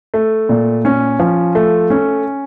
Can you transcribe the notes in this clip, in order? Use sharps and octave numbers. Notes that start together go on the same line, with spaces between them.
A3
A#2
C#4
F3
A3
C#4